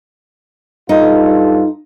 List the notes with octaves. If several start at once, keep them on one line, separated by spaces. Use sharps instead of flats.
G2 D#4 F4 A4